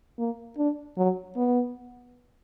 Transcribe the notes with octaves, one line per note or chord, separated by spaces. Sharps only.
A#3
D4
F#3
B3